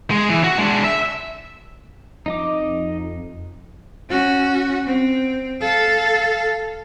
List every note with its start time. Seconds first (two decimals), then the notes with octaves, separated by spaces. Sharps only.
0.11 G#3
0.30 E3
0.44 F#4
0.59 G#3 D4
0.84 E5
2.26 F2 D#4 D#5 D6
4.10 C#4 F#4
4.87 C4
5.61 A4 F5